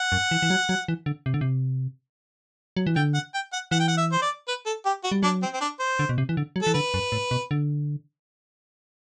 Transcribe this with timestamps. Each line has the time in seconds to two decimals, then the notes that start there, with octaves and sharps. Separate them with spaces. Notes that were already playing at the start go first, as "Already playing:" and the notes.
Already playing: F#5
0.12 F#2
0.31 E3
0.42 E3
0.50 F#3
0.69 F#3
0.88 E3
1.06 D3
1.26 C3
1.34 D3
1.41 C3
2.77 F#3
2.87 E3
2.96 D3 G5
3.14 F#5
3.34 G5
3.53 F#5
3.71 E3 F#5
3.80 G5
3.88 F#5
3.97 E5
4.12 C5
4.22 D5
4.48 B4
4.66 A4
4.86 G4
5.04 F#4
5.12 G3
5.23 F#3 D4
5.42 C4
5.54 C4
5.61 D4
5.79 C5
5.99 D3
6.09 B2
6.18 C3
6.29 E3
6.37 D3
6.56 F#3
6.62 E3 A4
6.74 D3 B4
6.94 F#2
7.12 A2
7.31 B2
7.51 D3